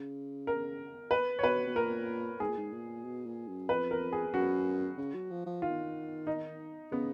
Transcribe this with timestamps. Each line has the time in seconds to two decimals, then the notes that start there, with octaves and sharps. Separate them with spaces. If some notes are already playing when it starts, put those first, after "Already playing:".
Already playing: C#3
0.47 A#4
1.11 B4
1.39 C#5
1.43 B2 B4
1.67 B2
1.76 A#2 A#4
2.40 G#2 G#4
2.49 A#2
2.57 G#2
2.73 A#2
3.04 B2
3.26 A#2
3.48 F#2
3.69 F2 B4
3.91 A#4
4.13 G#4
4.34 F#2 F#4
4.98 C#3
5.14 F#3
5.30 F3
5.46 F3
5.62 D#3 F4
6.27 D#4
6.92 C#3 B3